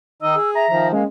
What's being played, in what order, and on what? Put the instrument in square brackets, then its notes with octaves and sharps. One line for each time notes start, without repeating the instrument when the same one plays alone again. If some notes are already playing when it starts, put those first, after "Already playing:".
[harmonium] D#3 D#4 D#5 [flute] E6
[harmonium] G#4
[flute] E5 [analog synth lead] A#5
[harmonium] D#3 F3 [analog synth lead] A#5
[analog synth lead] G#3 [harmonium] A#3 [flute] C#4